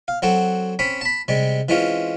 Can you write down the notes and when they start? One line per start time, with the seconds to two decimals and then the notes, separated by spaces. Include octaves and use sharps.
0.08 F5
0.22 F#3 C4 F#4 A4
0.79 C4 C#4 B5
1.01 A5 B5
1.28 C3 G3 G#3
1.69 E3 G#3 C4 C#4 F4